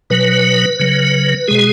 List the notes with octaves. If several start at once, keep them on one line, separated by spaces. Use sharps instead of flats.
B2 F#3 B4
C#3 F#3
B2 G#3 G#4